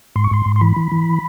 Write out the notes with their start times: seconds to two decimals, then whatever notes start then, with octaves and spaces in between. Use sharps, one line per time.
0.16 G#2 C6
0.24 C#6
0.31 G#2 C6
0.46 G#2
0.56 C6
0.61 E3 B5
0.77 E3
0.92 E3